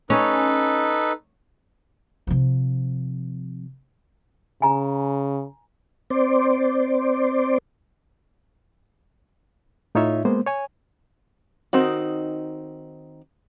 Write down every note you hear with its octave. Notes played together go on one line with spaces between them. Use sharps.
C#4 D#4 A4 B4
C3 F3
C#3 G#5 A#5
C4 C5 D5
A2 D#4 F4 C#5 E5
G#3 A#3 B3 C5
C#5 G#5
D#3 C4 D#4 F#4